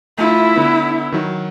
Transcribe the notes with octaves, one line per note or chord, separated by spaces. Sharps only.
A3 E4 F4
D3 B3
D#3 F#3